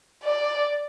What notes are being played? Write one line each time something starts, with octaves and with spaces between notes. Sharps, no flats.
D5